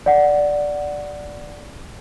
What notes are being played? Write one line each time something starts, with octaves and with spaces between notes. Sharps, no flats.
D5 F#5